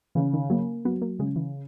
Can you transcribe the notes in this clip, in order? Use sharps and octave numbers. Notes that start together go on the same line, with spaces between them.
C#3 E3
D#3
F#3 A#3
F#3 B3
A#3
C#3 G#3
E3